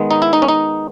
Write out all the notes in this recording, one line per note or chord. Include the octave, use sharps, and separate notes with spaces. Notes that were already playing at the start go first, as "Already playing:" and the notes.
Already playing: D#3 G#3 B3
D#4
E4
D#4
C#4
D#4